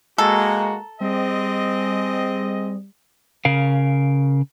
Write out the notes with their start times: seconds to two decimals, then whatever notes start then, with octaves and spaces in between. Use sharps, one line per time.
0.18 G#3 A#3 F#4 A4 A#5
1.01 G3 C4 G#4 D#5
3.45 C#3 A#4 F5